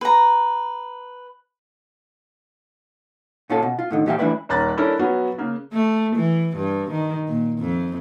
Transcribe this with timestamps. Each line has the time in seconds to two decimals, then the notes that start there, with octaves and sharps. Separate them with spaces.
0.01 B4 A#5
3.50 A#2 C#4 F4 A4
3.63 B2
3.79 F4
3.90 A2 D3 D#3
4.06 A#2 E3 G4 E5 F5 G5
4.18 E3 A3 D4 E4 B4 D5
4.49 D#1 C#4 A#5 F#6 A6
4.78 C#4 D4 E4 A4 A#4
4.99 F#3 B3 C#4 F#4
5.38 C#3 A#3
5.73 A3
6.16 E3
6.57 G2
6.91 D#3
7.28 A#2
7.59 F2